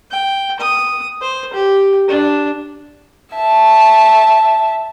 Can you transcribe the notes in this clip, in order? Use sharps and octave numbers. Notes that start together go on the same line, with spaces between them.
G5
D#6
C5
G4
D4
E5 A5